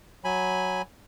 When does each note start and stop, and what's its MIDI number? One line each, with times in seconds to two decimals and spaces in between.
0.24 0.82 54
0.24 0.82 80
0.24 0.82 83